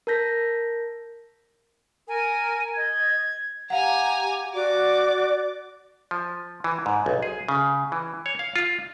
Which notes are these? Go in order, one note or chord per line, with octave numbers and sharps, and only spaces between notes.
A#4 A5 G6 A#6 B6
A#4 G#5
D#5 G#6
G4 F5 F#5 G#5 A#5
F#4 D5 D6
F3
E3
G#2
B1
G#4
C#3
E3
C#5
F5
F4